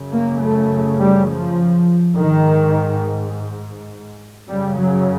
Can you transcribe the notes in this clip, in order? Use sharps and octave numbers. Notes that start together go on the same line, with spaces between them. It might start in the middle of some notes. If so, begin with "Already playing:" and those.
Already playing: F#2 C#3
A#3
A3
G3
F3
G#2 D#3
F#2 C#3 G3
F#3